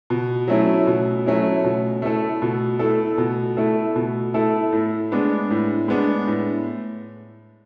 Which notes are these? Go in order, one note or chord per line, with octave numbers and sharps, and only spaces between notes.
B2
F#3 A3 C#4 E4
B2
F#3 A3 C#4 E4
B2
A3 E4 A4
B2
A3 E4 A4
B2
A3 E4 A4
B2
A3 E4 A4
A2
G#3 B3 D4
A2
G#3 B3 D4
A2